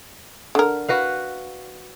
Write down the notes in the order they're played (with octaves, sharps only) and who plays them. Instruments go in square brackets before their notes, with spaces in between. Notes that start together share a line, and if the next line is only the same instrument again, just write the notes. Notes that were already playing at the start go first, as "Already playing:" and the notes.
[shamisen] D3 A#4
[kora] F#4 B4 F5